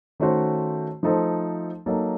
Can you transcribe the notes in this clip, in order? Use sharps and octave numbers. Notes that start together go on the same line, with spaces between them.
D#3 A3 C#4 F#4 C5
F3 A3 D#4 A4 C5
F#3 A#3 D#4 A4